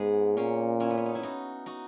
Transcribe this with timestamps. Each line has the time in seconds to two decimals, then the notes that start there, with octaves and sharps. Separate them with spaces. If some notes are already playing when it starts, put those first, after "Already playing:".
Already playing: G#2 G#3 B3
0.37 A#2 A#3 C#4
0.80 C#4 E4
0.90 B3
0.97 C#4
1.06 D#4
1.15 E4
1.23 D#4 F#4
1.66 D#4 F#4